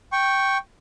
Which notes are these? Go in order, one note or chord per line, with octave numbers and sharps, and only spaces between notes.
G5 C#6